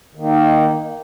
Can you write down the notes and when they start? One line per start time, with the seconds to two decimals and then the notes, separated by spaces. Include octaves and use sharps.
0.15 D#3
0.19 A#3
0.23 D#4